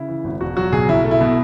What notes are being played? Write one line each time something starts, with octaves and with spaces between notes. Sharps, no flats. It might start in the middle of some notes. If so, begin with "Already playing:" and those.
Already playing: C#3 E4
E3
G#1
E1 F#4
F#3 F#4
B1 G#4
B1 E4
A3
E4
B2